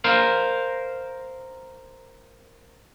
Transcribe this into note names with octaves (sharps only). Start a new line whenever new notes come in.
A#4 C5 F5